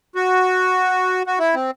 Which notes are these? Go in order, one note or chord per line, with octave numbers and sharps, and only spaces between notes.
F#4
F#4
E4
C4